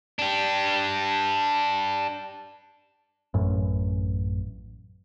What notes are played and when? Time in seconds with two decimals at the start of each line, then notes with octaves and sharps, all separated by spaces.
0.19 D4 G4
3.34 A1 F#2